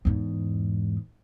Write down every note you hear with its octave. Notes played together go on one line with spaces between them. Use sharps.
E2 G#2